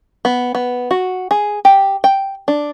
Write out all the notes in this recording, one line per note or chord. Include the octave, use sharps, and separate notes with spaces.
B3
B3
F#4
G#4
G4
G5
D4